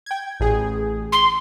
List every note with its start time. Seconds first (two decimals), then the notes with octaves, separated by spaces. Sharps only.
0.06 G5 G#6
0.40 A1 G#4
1.12 C6